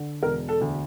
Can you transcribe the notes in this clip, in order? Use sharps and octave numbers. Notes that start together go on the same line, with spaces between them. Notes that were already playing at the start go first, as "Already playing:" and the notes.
Already playing: D3
E1 A#4
A4
D2